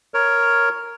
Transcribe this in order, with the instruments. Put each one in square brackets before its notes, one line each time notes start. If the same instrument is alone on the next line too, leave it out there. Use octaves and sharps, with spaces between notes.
[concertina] A#4 C#5